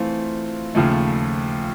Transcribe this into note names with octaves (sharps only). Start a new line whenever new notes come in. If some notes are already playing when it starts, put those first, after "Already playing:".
Already playing: E3 A3 C4 F4
D#2 C#3 F3 A3